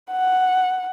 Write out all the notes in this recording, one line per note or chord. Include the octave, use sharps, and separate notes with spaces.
F#5